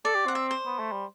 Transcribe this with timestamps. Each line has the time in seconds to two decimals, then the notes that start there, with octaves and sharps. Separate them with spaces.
0.05 A4 D5
0.15 G4
0.26 C4 F#5
0.35 E5
0.51 C5
0.66 B3
0.79 A3
0.92 G3